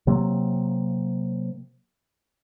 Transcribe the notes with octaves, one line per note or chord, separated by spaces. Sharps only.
C3 F#3 A#3